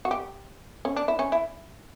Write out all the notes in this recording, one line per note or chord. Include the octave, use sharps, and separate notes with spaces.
F#4
G4
C#4
D4
E4
C#4
E4